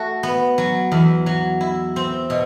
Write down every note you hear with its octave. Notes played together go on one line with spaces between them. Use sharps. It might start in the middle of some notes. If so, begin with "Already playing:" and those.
Already playing: A3 F#4
B3
F#3
E2
F#3
E4
C4
B2